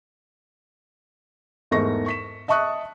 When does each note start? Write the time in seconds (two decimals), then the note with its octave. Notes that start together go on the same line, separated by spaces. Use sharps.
1.71 E2 G#2 A3 A#4 C#6 A#6
2.06 C#6 B6 E7
2.48 D#5 E5 A5 C#6 D#6 F#6